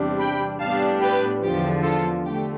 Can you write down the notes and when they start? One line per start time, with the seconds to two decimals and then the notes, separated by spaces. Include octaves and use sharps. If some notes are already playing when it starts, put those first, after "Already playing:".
Already playing: E2 C3 G3 D4
0.18 G5 B5
0.60 A2 G3 B3 D4 F5 A5
1.01 G4 B4
1.42 E2 D3 F3 G4
1.83 F4 A4
2.24 D3 A3 G4